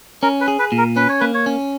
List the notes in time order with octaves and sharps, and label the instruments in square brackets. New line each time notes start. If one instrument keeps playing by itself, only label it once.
[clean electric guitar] C#4 [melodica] A#4
[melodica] B4
[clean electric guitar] G#4
[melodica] B4
[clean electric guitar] A#2
[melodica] A#4
[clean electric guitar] C#4 [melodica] B4
[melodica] C#5
[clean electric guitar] A#3 [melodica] B4
[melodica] C#5
[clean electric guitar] C#4